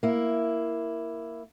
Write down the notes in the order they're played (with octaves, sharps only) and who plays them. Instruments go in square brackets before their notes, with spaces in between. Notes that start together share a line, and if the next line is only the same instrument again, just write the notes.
[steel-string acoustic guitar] A#3 E4